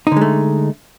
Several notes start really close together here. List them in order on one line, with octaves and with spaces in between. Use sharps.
D#4 D3 G#3 A3